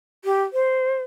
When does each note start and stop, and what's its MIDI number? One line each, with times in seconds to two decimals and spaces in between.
0.25 0.43 67
0.53 1.03 72